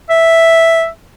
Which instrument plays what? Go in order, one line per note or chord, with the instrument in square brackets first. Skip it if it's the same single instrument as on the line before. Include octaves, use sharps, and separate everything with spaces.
[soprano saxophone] E5